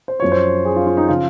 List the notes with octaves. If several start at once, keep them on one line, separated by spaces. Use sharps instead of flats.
C5
F#2 F3 C#5
C5
G#4
F4
F4
D#4
C#3 F3 F4